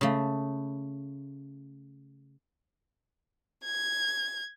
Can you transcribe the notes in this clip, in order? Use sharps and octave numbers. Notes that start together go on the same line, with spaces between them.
C#3 A3
G#6